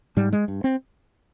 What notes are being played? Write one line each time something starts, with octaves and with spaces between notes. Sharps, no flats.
G#2 G3
G#3
G2
C4